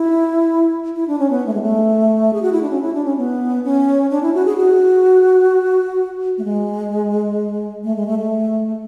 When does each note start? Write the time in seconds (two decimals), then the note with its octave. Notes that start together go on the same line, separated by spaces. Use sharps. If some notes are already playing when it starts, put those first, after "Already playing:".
Already playing: E4
0.96 E4
1.08 D4
1.19 C#4
1.30 B3
1.46 A3
1.53 G#3
1.62 A3
2.33 G#4
2.42 F#4
2.52 E4
2.62 D4
2.70 C#4
2.82 E4
2.94 D4
3.05 C#4
3.17 B3
3.64 C#4
4.11 D4
4.22 E4
4.34 F#4
4.45 G#4
4.57 F#4
6.38 A3
6.44 G#3
7.84 A3
7.96 G#3
8.07 A3
8.18 A3